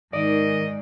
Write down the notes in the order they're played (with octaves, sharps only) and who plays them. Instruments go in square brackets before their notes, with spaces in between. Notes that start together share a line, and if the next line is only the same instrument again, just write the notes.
[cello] G#2 [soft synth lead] D#3 [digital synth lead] D5 [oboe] D#5